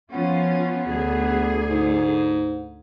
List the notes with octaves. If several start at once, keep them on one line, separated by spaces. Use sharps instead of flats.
F3 B3 C#4 F4
D2 G#4
G#2